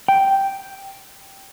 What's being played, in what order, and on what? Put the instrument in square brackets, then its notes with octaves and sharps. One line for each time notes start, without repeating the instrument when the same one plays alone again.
[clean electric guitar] G5